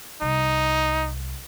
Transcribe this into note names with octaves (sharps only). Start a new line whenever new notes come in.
C2 D#4